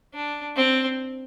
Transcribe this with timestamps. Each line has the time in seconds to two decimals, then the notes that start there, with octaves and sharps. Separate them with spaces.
0.14 D4
0.56 C4